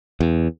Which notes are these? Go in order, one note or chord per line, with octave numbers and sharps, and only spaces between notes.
E2